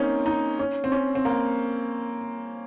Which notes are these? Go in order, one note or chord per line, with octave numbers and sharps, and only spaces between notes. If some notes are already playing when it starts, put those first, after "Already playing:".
Already playing: A#3 C4 C#4 D#4
D#4
C#4
C4
C#4
C4
A#3